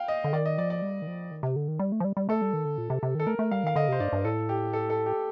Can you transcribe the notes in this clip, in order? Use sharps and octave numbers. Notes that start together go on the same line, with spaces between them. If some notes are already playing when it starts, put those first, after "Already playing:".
Already playing: F5 G5
D#5
D3
D#3 D5
D#5
F3 D5
D5
G3
D#3
F3
D#3
C3
D3
D#3
G3
A3
F3
G3
G3
A3 A4
G3
D#3
D3
A#2
C3
C3
D#3 A4
A3 A#4
A3
G3 F5
D#3 F5
D3 D#5
C3 C5
G2 D5
G2
A2 A4
G4
A4
A4
G4